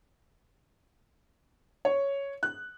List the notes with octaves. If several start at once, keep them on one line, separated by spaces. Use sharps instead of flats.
C#5
F#6